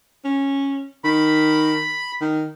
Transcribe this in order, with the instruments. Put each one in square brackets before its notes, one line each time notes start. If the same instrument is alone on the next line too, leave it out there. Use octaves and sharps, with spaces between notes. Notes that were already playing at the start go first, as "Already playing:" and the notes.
[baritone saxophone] C#4
[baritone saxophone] D#3 [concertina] B5
[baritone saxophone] D#3